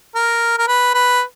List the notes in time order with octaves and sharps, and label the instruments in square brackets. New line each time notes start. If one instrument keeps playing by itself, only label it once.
[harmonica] A#4
A#4
B4
B4